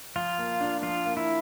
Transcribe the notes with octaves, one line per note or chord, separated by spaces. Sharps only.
F3 F4
A#3
D4
F3 F4
A#3
E4